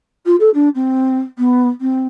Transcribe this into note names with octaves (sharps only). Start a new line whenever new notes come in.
F4
A4
D4
C4
B3
C4